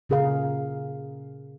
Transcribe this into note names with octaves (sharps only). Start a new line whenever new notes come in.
A#2 C#3 G#4 A#4 F5